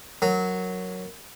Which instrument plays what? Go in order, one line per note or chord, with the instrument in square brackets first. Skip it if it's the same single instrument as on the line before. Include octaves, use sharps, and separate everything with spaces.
[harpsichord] F#3 [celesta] A#4